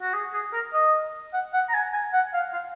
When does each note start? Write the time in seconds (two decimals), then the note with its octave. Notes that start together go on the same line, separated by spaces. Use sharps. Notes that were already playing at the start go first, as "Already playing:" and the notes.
0.02 F#4
0.14 G#4
0.33 G#4
0.53 A#4
0.73 D#5
1.33 F#5
1.53 F#5
1.69 A#5
1.74 G#5
1.93 G#5
2.13 F#5
2.33 F5
2.53 F5